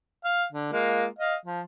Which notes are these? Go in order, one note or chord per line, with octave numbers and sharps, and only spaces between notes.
F5
D3
G#3 A#3 F4
D#5 F5
F3